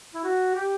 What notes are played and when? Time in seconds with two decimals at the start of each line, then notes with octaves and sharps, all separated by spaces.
0.14 E4
0.24 F#4
0.55 G4